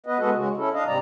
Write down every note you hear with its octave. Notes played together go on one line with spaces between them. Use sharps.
B3 B4 D#5
G#3 B3 F#4 A4 B4 D#5
C#3 G#3 F#4
C#4 E4 A4
D4 D#5 F5
G#2 C3 G3 C4 D5 A#5